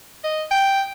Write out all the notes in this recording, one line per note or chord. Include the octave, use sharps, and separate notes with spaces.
D#5
G5